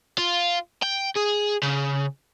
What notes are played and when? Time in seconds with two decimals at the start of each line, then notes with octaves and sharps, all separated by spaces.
0.18 F4
0.83 G5
1.16 G#4
1.63 C#3